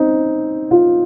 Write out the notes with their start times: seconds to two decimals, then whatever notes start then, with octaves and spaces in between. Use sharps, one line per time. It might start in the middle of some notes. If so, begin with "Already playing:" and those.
Already playing: C4 D#4
0.71 F4